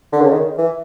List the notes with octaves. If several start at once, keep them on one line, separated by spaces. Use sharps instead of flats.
D3
C#3
D#3
E3